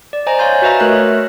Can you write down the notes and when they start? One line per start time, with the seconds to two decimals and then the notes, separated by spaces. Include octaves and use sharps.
0.13 D5
0.27 C5 D#5 G#5 A#5
0.39 C#5 F5 G#5 C6 G6 A6
0.62 F#4 B4 D#5 E5 A#5
0.80 A3 F#4 A#4 C#5 F#6